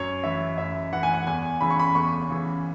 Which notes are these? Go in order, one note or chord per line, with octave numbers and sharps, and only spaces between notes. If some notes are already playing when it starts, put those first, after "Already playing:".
Already playing: F#2 C#5
E3 E5
F#2 E5
E3 F#5
G#5
F#5
E2 G#5
C#3 E3 B5
C#6
B5
E2 C#6
C#3 E3